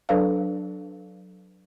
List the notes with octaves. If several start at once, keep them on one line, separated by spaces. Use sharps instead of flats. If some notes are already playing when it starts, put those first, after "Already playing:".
F#3 D4 A4 B4 D5 F5